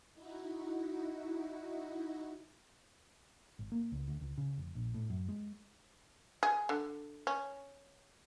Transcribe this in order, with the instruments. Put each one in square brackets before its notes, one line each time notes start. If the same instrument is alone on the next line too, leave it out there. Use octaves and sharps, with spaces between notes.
[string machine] D#4 E4 F#4
[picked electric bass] G#1
A#3
C#2
D2
C#2
C#3
F1
A#1
A2
F#2
G#3
[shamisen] G#4
D3
C#4